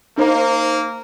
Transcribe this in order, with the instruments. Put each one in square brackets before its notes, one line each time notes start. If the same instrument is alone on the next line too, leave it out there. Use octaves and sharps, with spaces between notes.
[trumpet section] A#3 [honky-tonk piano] D#4 A#4 C5